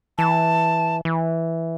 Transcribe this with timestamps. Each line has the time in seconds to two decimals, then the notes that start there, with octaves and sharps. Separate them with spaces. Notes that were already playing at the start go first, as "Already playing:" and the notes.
0.18 E3 A5
1.05 E3